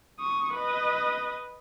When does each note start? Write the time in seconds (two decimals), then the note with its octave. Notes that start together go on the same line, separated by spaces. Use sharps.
0.20 C#6 D#6
0.55 B4 D#5